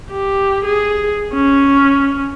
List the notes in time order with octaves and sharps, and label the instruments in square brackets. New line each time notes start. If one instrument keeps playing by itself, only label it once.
[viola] G4
G#4
C#4